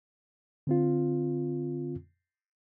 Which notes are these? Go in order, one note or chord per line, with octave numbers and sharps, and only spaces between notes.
D3 C4 F4